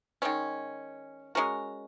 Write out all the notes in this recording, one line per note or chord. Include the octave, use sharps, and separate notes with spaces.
D#3 G#3 C#4
G#3 C#4 F#4 A#4